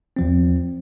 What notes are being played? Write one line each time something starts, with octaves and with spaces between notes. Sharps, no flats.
E2 F3 C4